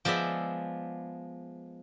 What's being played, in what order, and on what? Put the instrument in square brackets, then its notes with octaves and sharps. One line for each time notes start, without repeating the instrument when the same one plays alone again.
[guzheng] F3 G#3 B3 D5 E5